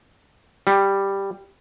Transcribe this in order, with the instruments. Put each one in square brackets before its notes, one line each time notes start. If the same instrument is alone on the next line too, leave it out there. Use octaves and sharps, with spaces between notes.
[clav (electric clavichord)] G3